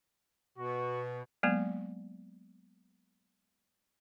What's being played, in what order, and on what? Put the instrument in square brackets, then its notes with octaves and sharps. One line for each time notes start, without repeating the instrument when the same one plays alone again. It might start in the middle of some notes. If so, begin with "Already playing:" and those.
[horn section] B2 [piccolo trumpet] F#4
[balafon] F#3 G#3 A#3 B3